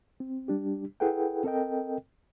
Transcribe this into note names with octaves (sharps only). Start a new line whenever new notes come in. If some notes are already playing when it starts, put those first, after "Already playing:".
C4
G3 D4 G4
E4 G#4 A4 B4 F#5 G5
C4 A4 A#4 D#5 G5